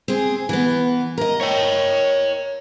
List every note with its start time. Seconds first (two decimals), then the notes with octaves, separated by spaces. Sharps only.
0.08 C4 G#4
0.49 E3 B3
1.18 A#4 D#5
1.41 C#5 G5